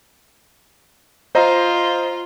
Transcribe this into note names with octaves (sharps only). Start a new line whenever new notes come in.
F4 C5 D#5 A#5